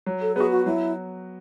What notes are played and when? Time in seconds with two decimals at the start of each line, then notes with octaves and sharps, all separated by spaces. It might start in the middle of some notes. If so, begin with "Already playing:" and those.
0.06 F#3
0.22 A4
0.35 B3 F#4 G#4
0.51 F#4
0.66 F#3 E4